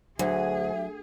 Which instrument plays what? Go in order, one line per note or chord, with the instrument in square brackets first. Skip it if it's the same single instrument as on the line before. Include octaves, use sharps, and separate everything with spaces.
[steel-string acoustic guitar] D2 [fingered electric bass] F#3 [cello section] G#4 [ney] E5